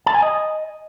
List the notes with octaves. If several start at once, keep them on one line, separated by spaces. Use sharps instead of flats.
A5
G#5
D#5